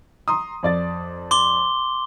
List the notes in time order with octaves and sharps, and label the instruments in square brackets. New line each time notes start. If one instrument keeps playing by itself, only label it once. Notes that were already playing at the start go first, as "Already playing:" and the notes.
[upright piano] A#5 C6 D#6
F2 D5 A6
[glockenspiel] C6 D6 G7